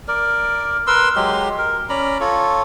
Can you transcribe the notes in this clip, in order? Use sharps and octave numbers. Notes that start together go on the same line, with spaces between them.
A#4 D5
A#4 B4 C6 E6
F#3 G#3 G4 C6
A#4
C#4 D5 A#5 B5
F4 A4 C#5